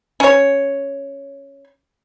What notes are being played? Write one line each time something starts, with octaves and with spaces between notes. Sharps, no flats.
C#4 C#5